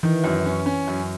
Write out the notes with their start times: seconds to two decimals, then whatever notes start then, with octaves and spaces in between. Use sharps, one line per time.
0.03 D#3 E3
0.23 F#2
0.45 C#4
0.66 C#4
0.87 F#2